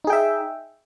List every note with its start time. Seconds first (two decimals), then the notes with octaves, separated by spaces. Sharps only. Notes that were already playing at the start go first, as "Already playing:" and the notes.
0.04 D#4
0.07 G#4
0.10 G5
0.13 E5